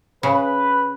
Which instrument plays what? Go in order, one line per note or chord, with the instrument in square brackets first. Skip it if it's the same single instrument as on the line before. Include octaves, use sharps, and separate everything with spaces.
[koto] C#3 [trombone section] B4